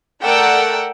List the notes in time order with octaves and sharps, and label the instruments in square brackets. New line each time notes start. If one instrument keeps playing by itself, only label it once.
[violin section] A3 A#4 D5 F#5 G5 E6